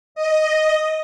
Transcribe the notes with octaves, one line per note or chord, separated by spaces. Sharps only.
D#5